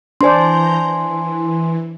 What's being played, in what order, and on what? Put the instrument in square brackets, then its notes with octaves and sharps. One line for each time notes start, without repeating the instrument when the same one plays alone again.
[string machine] E3 A#5 G6 [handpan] D4 C5 D5 [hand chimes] G#5 C6
[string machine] E3